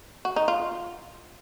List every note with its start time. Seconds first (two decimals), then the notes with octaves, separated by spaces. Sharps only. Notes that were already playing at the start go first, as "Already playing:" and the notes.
0.25 F#4
0.36 D#4
0.48 F4